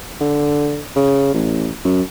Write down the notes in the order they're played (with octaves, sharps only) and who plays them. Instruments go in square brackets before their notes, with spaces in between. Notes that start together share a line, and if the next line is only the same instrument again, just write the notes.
[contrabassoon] D3
C#3
A1
F#2